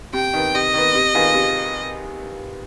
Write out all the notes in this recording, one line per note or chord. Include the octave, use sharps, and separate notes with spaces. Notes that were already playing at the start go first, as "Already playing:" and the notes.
C3 G5
D#3 B3
C3 D#5
D#3 B3
C3
D#3 B3 F4 G#4
C3